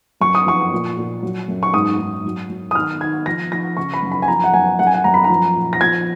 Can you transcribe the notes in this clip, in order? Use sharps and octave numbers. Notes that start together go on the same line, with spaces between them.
F#2 C#6
D#6
F3 C#6
A#2
A#2
F#3
F#2
C#6
G#2 D#6
G#2
F#3
F#3
D#6
D#3 F6
D#3 G#6
F3 A#6
F3 A#6
C#3 C#6
B5
F#2
B5
G#5
F3 A#5
F#5
F#2 G#5
F#2 F#5
G#5
F#5
F#2 A#5
B5
A#5
F3
A#2
A#6
F3 G#6